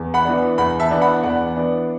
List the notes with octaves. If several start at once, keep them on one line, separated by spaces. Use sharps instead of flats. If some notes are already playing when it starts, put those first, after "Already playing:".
Already playing: E2
F#5 B5
E3 B3 D4
E2 F#5 B5
E5 A5
E3 B3 D4
F#5 B5
E2 D5 F#5
E3 B3 D4